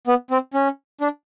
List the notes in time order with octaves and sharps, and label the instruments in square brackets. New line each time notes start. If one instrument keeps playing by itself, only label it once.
[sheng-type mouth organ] B3
C4
C#4
D4